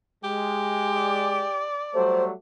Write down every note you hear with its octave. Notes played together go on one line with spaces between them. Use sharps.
G#3 G4
D5
F#3 G3 A3 C5